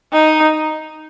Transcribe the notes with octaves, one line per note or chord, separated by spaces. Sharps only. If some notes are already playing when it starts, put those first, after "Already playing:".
D#4